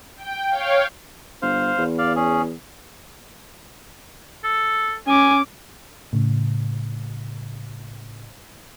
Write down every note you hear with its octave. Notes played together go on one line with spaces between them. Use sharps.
G5
C#5 F5 G5
G1 C5 F5
E2
D5 F5
C#4 G#4
A4
C#4 G#5 D6
A2 C#3